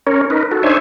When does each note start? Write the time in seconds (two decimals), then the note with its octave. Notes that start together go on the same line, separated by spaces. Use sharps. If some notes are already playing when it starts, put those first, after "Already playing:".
0.07 C#4 A#4 C#5
0.30 D#4 A#4 B4
0.51 F#4 A4
0.63 D4 D#4 C5 C#5 E5 G#5